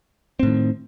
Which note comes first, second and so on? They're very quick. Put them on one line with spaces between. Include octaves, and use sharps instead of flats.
C4 A2 D#3